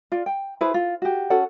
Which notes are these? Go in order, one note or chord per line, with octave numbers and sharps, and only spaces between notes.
F4 D5
G5
E4 G#4 B4 C5
F4
F#4 G4
C#4 F#4 A4 F#5